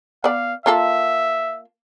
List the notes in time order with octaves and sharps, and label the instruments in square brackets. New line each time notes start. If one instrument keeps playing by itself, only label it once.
[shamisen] B3 D5 [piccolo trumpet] F5
[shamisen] A#3 F4 A4 [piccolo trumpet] E5